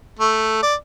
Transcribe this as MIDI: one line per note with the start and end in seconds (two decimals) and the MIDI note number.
0.19 0.59 57
0.63 0.75 74